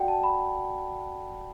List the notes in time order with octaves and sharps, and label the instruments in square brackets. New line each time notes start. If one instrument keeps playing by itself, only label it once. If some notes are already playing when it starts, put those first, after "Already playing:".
Already playing: [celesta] F#4 A4 D5 F#5 G5
A5
B5